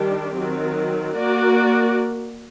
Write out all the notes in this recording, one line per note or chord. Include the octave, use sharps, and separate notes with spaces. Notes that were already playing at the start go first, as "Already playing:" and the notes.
Already playing: D#3 G3 D4 G4
D#3 F#3 C4
A#3 F#4 A#4 D5